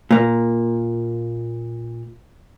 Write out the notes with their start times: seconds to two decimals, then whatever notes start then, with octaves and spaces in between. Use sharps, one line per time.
0.11 A#2 A#3